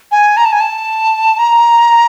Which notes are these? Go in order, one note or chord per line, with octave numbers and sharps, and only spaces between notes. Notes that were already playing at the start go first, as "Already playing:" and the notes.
G#5
A#5
A5
G#5
A5
A#5